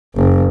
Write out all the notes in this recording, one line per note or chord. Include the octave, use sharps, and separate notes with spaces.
F#1